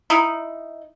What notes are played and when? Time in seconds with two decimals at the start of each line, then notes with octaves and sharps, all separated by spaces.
0.10 D#4 E4